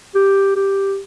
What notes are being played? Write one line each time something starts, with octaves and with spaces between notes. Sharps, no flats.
G4
G4